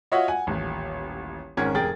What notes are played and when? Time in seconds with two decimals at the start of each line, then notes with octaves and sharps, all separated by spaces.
0.12 F4 F#4 C#5 D#5 E5 F#5
0.28 F#5 G#5
0.47 D#1 A1
1.57 G#1 G#2 C#4 A#4 F#5 G#6
1.74 F1 G#4 A#4 G5 A6